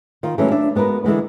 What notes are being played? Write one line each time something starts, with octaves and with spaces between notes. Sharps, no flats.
D#3 F4
D#3 E3 F#3 G#3 A3 C#4
D4 E5
G#3 B3 F#4 A#4 B4
D3 E3 G#3 B3